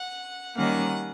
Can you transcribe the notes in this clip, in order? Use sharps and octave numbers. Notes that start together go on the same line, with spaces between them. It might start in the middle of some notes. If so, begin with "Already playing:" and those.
Already playing: F#5
D#3 G3 A#3 C#4 F#5